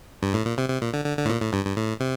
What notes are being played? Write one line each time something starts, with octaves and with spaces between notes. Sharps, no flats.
G2
A2
A#2
C3
C3
A#2
D3
D3
D3
A2
A#2
A2
G2
G2
A2
C3